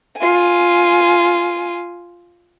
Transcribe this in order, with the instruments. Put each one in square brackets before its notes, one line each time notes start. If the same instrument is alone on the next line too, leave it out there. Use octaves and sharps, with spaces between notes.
[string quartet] F4 G#5